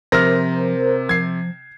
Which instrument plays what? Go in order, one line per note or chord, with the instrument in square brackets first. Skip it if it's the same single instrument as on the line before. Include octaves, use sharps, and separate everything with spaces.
[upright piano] C3 [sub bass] F3 [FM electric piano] A#4 C5 [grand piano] F6 A#6
[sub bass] F3 [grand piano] G#6 C7